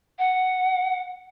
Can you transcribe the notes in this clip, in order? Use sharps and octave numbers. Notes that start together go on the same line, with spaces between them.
F#5